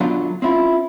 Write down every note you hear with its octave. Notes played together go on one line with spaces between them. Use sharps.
F#2 B2 D3 F#3 D4 F4
C4 C#4 E4 F4